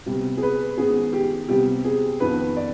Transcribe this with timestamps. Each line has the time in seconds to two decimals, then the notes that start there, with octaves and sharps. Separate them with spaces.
0.06 C3 G3 B3
0.37 G#4
0.42 B4
0.77 G#2 D#3 B3 G#4
1.13 G4
1.48 C3 G3 B3 G4
1.85 G#4
2.20 F2 D#3 B3 B4
2.56 D5